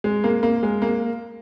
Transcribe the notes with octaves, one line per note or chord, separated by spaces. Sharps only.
G#3
A#3
A#3
G#3
A#3